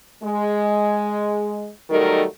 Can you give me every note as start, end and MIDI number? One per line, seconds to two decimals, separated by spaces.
0.23 1.70 56
1.90 2.24 51
1.90 2.24 54
1.90 2.24 55
1.90 2.24 57
1.90 2.24 63
1.90 2.24 70